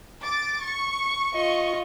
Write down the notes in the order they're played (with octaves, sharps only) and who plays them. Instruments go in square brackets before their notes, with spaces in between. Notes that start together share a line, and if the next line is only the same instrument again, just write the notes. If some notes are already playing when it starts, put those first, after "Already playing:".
[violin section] D6 A6
C#6
[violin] F4 D#5 [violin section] C#6